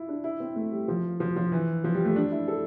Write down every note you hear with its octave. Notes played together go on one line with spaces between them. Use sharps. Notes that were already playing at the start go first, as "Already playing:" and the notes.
Already playing: E4 F4
D4
E4
C4
A3
G3
F3
F3
F3
E3
F3
G3
A3
D4
E4
A4